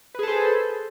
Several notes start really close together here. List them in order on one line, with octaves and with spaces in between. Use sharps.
B4 G#4 A4 C5